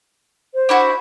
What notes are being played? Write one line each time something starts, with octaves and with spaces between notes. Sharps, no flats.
C5
D4 E4 F#4